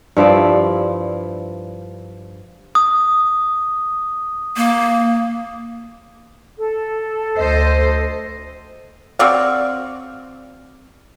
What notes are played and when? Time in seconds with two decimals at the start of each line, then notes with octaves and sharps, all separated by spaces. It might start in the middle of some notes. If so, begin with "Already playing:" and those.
0.17 G2 F3 E4 D5
2.75 D#6
4.57 A#3
6.59 A4
7.38 D2 C5 D#5
9.19 C4 F#4 D5 F5